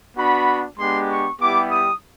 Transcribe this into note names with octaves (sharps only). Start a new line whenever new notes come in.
B3 D4 F#4 B5
G#3 B3 D4 G4 C6
C#6
G3 B3 E4 G4 D6
D#6